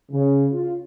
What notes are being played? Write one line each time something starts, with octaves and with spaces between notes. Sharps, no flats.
C#3
F4